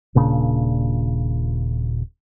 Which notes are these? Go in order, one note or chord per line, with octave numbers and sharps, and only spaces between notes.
D#1 A#2 C#3 D4